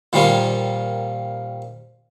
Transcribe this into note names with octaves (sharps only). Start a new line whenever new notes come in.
A#2 D#3 F3 G3 A#3 F4